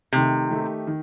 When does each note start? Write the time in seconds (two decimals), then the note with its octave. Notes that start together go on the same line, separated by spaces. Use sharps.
0.13 C3 D#3 A3 D#4 G4
0.51 D#3 A3 D#4 G4
0.87 D#3